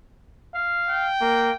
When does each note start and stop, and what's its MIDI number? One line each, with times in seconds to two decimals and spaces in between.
0.55 1.08 77
0.89 1.56 79
1.21 1.51 58